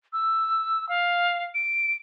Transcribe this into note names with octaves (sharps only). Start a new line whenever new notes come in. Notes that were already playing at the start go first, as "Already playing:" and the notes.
E6
F5
D7